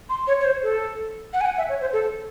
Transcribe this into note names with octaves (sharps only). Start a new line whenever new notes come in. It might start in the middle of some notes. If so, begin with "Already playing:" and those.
C6
C#5
C#5
C5
A4
F#5
G#5
F#5
E5
C#5
C5
A4